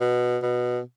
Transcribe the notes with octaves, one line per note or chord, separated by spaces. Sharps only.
B2
B2